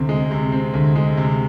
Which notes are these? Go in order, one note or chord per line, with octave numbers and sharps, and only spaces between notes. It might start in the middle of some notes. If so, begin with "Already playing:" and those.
Already playing: D2 C3 C4
G#3
C3
C4
D2
G#3
C3